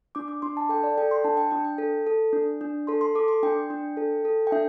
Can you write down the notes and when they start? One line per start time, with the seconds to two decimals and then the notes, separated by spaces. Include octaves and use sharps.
0.15 D4 D6
0.28 D6
0.42 D4 C6
0.57 A5
0.69 A4 G5
0.83 D5
0.98 A4 G5
1.11 C6
1.24 D4 A5
1.37 G5
1.51 D4 G5
1.65 G5
1.78 A4
2.07 A4
2.33 D4
2.61 D4
2.87 A4 C6
3.01 C6
3.15 A4 D6
3.28 C6
3.43 D4 G5
3.70 D4
3.97 A4
4.25 A4
4.47 G5
4.52 D4 E5